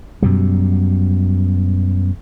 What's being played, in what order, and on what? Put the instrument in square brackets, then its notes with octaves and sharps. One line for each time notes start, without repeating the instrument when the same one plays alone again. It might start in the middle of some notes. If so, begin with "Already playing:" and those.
[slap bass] F#2 B2 G3